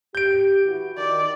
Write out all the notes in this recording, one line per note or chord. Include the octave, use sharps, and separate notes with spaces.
G4 G6 D7
E3 E4 F#4
D#3 D5